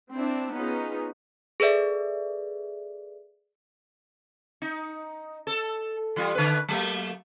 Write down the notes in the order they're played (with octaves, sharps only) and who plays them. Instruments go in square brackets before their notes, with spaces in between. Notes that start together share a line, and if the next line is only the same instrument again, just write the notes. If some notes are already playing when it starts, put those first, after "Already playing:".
[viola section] C4 D4 E4
B3 C#4 D#4 F4 G#4
[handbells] G#4 A4 B4 D5 E5
[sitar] D#4
A4
E3 G3 F4
D3 B4
F#3 A3 A#3